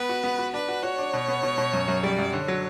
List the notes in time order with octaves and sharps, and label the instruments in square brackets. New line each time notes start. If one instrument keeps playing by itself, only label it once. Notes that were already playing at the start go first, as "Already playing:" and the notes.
Already playing: [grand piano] B3 [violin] B4
[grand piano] F#4
B3
F#4
[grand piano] D4 [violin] B4
[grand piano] F#4
[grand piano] F#4 [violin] C#5
[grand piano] D4
B2
B3
B2
B2
F#2
F#2
[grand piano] G3 [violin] D5
[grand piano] F#2
[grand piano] D3 [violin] C#5
[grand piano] F#3